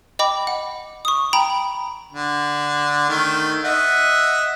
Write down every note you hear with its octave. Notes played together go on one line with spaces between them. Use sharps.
D#5 G5 B5 D6
F#5
C#6 D#6
G5 A#5 B5 D7
D3
D#3 A3
D#5 E5 F#5